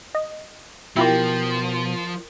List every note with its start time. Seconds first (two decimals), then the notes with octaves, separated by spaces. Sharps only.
0.15 D#5
0.97 B2 F3 E4 F4 G4 A#4 G5